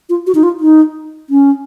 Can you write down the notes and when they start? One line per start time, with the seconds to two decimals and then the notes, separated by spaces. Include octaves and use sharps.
0.09 F4
0.27 F#4
0.35 D#4
0.43 F4
0.60 D#4
1.30 C#4